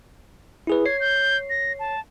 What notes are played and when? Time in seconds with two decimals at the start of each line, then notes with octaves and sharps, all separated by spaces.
0.67 E4 G#4 B4
0.85 C#5 G#6 C7
1.00 G6
1.50 A#6
1.79 A5